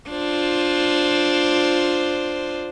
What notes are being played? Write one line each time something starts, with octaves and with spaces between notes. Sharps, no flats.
D4 F4 C5